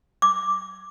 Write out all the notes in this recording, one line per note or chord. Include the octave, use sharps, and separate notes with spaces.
D6